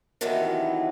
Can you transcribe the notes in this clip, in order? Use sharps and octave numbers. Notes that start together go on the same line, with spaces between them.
C3 D#3 E3 F#3 A3 B3